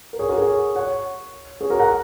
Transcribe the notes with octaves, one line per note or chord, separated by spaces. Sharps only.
A#4
G#4 C#5
F#4 A#4
G#4 C#5
C#5 F#5
G#4 C#5
F#4 A#4
F#5 A#5